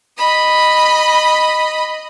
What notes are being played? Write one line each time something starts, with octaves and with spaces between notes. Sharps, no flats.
D#5 B5